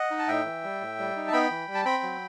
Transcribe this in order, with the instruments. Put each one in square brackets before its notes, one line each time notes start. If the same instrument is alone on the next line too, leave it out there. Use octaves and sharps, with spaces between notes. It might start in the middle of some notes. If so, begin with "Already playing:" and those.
Already playing: [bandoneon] D#5 F#5
D#4
A5
A2 E5 G5
E3
G3
A2
G3
D#4
A5
B3 G5 B5
E3
G3
A5
C4 G5 B5
F#3